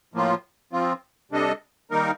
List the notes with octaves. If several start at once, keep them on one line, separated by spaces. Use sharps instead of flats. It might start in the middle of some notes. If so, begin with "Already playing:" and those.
A2 F3 A#3 F4
F3 C4 F4
C3 G3 D4 A4 D#5
D#3 G3 A#3 D#4 A#4